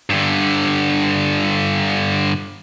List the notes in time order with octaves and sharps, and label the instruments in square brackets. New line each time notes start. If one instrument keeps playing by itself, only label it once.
[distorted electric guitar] G2 D3